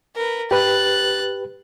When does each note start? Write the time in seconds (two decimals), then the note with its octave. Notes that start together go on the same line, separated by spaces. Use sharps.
0.15 A#4 B4
0.51 G4 B4 F#6 A6